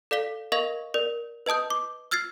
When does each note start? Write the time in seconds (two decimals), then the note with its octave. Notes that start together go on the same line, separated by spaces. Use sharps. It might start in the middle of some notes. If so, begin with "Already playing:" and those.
0.11 A4 D5 F5 B6 G7
0.52 A#4 D#5 F5 C#6 G#6 A#6
0.94 A#4 D5
1.46 B4 D#5 A5 D#6 G6
1.70 D6
2.11 E6 F6 G#6 A6 C7